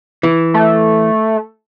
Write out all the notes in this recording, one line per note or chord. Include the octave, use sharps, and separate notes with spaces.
E3
A3